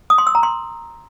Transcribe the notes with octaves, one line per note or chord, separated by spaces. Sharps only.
D#6
C6
E6
A#5
C6